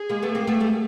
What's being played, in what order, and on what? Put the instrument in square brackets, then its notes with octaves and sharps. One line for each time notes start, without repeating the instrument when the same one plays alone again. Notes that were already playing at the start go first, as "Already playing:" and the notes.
Already playing: [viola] G#4
[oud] G#3 A#3
A3 B3
A#3 C4
A3 B3
G3 A3